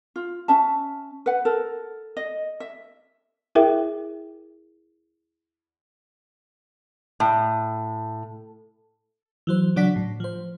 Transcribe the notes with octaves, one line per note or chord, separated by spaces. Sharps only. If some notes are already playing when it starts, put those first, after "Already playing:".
F4
C#4 E5 A5
B4 F#5
A4 A#4
D#5
E5
E4 G#4 A#4 E5 G5
A2
E3 F#3 C5
C#3 F#3 D4 D5 F#5 B6
A2
F3 C5